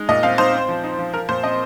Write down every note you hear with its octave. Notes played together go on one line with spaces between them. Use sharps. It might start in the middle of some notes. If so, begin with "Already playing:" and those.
Already playing: G#3 D#4
A#2 D#5
C4 F5
D#4 C5
C4
F3
D#4
F3
F3 A#4
A#2 C5
C4 D#5